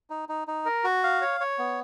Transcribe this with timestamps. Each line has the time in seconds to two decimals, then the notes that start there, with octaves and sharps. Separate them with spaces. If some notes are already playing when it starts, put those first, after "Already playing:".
0.10 D#4
0.29 D#4
0.48 D#4
0.65 A#4
0.84 F#4
1.03 F5
1.21 C#5
1.40 C#5
1.58 B3